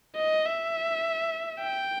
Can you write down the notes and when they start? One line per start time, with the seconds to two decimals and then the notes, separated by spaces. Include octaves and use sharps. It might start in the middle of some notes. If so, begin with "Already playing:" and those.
0.16 D#5
0.45 E5
1.61 G5